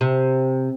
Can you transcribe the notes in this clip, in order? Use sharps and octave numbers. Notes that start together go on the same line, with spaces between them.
C3